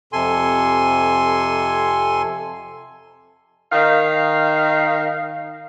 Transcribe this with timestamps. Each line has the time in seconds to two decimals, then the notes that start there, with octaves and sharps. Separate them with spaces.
0.13 F2 C3 A4 G#5 C6
3.72 D#3 F5